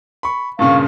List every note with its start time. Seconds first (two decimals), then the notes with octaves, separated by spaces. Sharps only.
0.23 B5 C#6
0.59 G2 A#2 C#3 F5 C#6